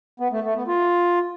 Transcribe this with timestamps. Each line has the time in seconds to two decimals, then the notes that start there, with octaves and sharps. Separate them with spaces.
0.20 B3
0.32 A3
0.44 A3
0.56 B3
0.68 F4